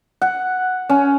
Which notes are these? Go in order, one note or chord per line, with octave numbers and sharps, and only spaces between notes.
F#5
C#4